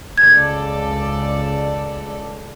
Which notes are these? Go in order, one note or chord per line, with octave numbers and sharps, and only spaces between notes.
C#2 A4 D5 G#6